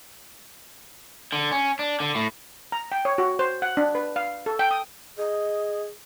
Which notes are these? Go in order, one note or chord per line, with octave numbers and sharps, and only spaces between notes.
D3
C#4
D4
D3
A2
A#5
G5
C#5
F#4
C5
F#5
D4
B4
F5
A4
G5
D#6
G#4 D#5